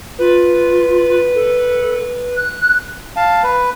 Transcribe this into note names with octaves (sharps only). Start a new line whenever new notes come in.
F4 B4
A4
F#6
F5 A5
B4